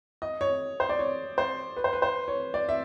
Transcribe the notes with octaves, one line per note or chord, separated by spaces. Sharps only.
D#5
C#5
C5
D5
C#5
C5
B4
C5
B4
C5
C#5
D5
E5